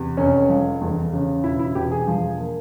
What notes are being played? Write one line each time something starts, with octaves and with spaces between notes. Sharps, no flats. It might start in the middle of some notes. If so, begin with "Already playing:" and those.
Already playing: E2 C3
F1 C#4
F3
E2
C#3
E1 E4
E4
E1 G4
G#4
F3
A#3